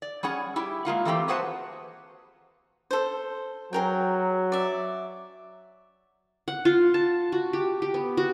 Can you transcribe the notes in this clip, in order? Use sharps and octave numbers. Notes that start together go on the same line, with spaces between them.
D5
G3 C#4 G#4 F#5
E4 G4
G#3 A#3 F4 F#5
E3 A3 A#3 C4 G4
F#4 G#4 B4 C5 F#5 A5
A4 C5
F#3 G#4 A#4 G5
D5 E5
F#5
F4
A5
F#4
G4
G4
B3
F#4